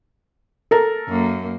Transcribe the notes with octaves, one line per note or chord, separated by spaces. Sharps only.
A4 A#4
F#2 A#3